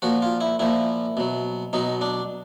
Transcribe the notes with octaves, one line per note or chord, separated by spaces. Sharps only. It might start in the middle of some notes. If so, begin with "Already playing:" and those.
A#2 F3 F#4
F4
E4
A#2 F3 E4
B2 F#3
B2 F#3 D#4
D4